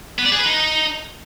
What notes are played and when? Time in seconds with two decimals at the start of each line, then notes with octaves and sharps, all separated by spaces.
0.19 B3
0.25 D5
0.32 G#4
0.39 B4
0.45 D#4